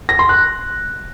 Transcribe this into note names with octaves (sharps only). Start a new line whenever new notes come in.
A#6
C6
F#6